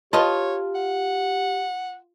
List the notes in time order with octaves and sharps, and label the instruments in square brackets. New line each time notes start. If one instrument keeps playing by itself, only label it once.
[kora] F4 [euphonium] G4 [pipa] B4 D#5 A5 [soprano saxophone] C#5
[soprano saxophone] F#5